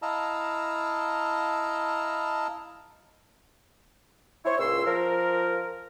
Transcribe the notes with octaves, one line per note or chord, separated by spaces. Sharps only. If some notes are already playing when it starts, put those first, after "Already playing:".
E4 D#5 F5 A5 A#5 E6
E4 C5 C#5
C#2 A#2 C6 E6
F3 A#4